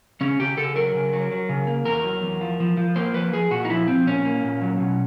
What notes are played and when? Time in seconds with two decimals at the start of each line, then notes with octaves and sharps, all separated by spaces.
0.21 C#3 C#4
0.39 C#3 G4
0.57 C#3 A4
0.76 F#3 A#4
0.94 C#3
1.13 F#3
1.31 F#3
1.49 C#3
1.67 A#3
1.85 E2 A#4
2.04 F#3
2.23 E2
2.41 F3
2.60 F3
2.77 F3
2.96 A#3 C5
3.14 F3 B4
3.33 F3 G#4
3.51 A#2 F#4
3.65 D#4
3.70 F3 E4
3.88 F3 C4
4.07 A#2 C#4
4.25 A#3
4.44 A#2
4.61 F#3
4.80 B2